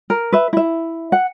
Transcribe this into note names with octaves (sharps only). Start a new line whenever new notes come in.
A#4
B4 E5
E4 E5
F#5